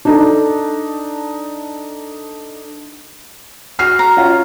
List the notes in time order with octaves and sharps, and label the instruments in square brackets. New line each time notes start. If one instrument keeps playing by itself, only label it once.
[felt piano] D4 D#4 A4
F#4 F6 C7
[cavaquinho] A#5
[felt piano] C#4 F4